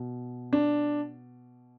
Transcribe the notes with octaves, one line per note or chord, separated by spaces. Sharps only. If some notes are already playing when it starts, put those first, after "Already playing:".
Already playing: B2
D4